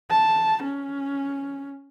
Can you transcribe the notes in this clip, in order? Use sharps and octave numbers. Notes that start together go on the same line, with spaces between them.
A5
C#4